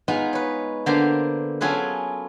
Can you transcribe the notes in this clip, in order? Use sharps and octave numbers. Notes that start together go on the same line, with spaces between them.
G#3 B3 D#4 F4 G#4
B4 C#5
D3 A#3 B3 C5 A#5 C6
F#3 C#4 F4 G#4 A4 B4